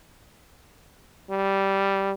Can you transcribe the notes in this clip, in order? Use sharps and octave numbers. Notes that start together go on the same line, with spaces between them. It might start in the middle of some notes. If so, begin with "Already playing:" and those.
G3